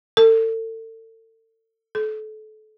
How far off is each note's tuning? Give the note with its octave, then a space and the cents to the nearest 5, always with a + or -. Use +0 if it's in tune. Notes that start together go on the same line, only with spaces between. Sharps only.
A4 +35
A4 -30